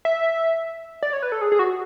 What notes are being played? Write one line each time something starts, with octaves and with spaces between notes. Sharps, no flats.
E5
D5
C#5
B4
A4
G#4
G#4
F#4